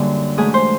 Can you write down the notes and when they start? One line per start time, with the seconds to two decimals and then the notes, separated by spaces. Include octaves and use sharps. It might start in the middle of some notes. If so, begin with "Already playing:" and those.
Already playing: F#2 D3 G3 A#3
0.38 G#2 E3 A3 G#4
0.54 C5